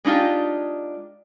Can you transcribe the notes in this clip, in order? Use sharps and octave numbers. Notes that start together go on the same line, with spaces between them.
G#3 D4 D#4 F4 G4